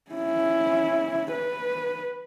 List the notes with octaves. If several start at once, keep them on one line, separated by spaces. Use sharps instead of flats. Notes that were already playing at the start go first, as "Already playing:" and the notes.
C#4 E4
B4